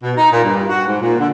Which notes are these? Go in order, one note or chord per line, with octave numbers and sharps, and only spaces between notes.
B2
D#4
A#2
G2
F#4
G#2
A#2
D3